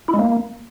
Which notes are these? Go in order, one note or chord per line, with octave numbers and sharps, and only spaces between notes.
E4
G#3
A#3